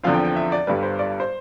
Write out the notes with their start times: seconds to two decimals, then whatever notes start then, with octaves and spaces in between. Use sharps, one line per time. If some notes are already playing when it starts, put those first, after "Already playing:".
0.03 E2 D3 F3 C4 F5
0.14 G5
0.25 G5
0.36 E5
0.52 D5
0.67 G1 G2 D3 G3 B4
0.83 C5
0.99 D5
1.20 C5